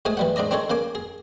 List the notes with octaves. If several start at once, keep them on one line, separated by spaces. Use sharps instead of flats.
G#2 A3 G#4 G#5 D#6
E3 G3 F#5
G#2 D4 D5 A#5 D#6
C4 D4 D#4 G#4 A4 C#5
C#3 A#3 G#5 D6
G#4